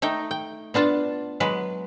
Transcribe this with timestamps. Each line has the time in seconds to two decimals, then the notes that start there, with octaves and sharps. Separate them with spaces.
0.02 A3 D#4 G5
0.31 G5
0.74 B3 D4 F4 A5
1.40 F#3 G#3 B4